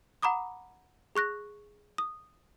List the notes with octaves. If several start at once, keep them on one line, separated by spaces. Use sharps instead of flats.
F#5 A#5 B5 D6 D#6
G#4 C#6 F#6 A#6
D#6